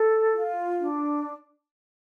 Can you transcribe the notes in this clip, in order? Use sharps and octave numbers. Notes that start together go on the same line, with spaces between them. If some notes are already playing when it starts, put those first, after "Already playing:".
Already playing: A4
F4
D4